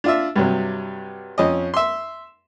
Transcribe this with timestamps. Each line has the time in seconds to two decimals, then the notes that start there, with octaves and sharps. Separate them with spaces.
0.04 D4 F4 E5
0.36 G2 C3 F#3
1.38 F2 C#4 D#5
1.74 E5 C6